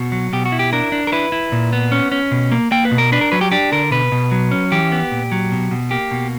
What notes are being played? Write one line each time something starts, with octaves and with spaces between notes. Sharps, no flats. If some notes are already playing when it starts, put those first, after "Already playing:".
Already playing: B2 F#4
F#3
B2 G4
F#4
E4
G4
D4 A#4
D4
A#4
E4 B4
E4
A#2
B3
C#4
C#4
B2
A#3
A#3 G5
B4
B2
A#4
D4 B4
A#4
F#3 B4
G4
D4 G4
D3 A#4
B2 B4
B2
F#3
C#4
E3 G4
B3
A#2
F#3
B2
B2
A#3 G4
B2